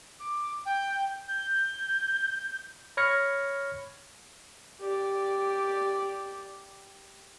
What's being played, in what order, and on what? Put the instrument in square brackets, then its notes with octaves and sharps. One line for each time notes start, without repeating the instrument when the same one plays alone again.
[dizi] D6
G5
G6
[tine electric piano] C#5 B5 F6 G#6 A#6 C#7
[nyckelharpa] G4 D5